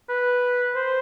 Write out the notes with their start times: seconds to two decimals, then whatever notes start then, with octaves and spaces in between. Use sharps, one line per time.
0.09 B4
0.75 C5